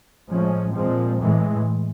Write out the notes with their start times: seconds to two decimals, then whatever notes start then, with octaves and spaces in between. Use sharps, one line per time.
0.30 A2 F3 G#3 C#4
0.75 A#2 F3 G#3 C4
1.20 A2 E3 G#3